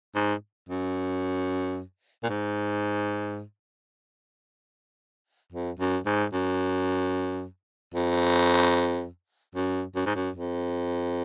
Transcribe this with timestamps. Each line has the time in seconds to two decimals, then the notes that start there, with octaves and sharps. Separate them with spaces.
0.15 G#2
0.69 F#2
2.23 A#2
2.29 G#2
5.52 F2
5.79 F#2
6.06 G#2
6.33 F#2
7.94 F2
9.55 F#2
9.95 F#2
10.06 G#2
10.15 F#2
10.36 F2